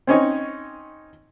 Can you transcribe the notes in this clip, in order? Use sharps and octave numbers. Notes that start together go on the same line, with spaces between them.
C4 C#4 D#4 C#5